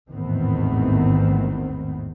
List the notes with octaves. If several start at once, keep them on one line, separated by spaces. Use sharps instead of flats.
A1 E2 G#2 D#3 B3 C4